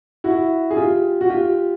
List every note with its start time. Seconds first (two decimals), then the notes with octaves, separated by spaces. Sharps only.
0.24 E4 F#4
0.70 G#4
0.77 F4 G4
1.21 F#4
1.30 F4 G4